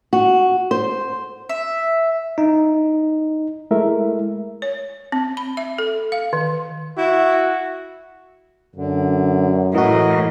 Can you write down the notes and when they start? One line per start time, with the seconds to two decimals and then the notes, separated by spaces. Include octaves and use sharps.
0.13 F#4
0.71 C5
1.49 E5
2.38 D#4
3.71 G#3 A3 E4 A#4 E5
4.62 C#5
5.12 C4
5.37 B5
5.57 E5
5.78 A4
6.12 F5
6.33 D#3
6.98 E4 F#4
8.75 F#2 D3
9.75 A2 E3 F#4 A#4 D#5